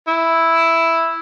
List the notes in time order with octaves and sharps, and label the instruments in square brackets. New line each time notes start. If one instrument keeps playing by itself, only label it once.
[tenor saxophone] E4